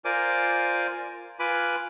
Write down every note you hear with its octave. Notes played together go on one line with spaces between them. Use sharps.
F4 A#4 C5 D5 G#5 D6
F4 B4 G#5 B5 D6